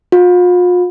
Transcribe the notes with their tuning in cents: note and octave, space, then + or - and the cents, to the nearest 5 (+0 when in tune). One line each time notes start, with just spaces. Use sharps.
F4 +40